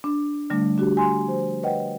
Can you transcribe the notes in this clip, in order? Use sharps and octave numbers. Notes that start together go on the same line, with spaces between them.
D4
D3 G3 A3 D4
D4 F#4 G4
G#5 C6
F3 C5
B4 C#5 D#5 F#5 G5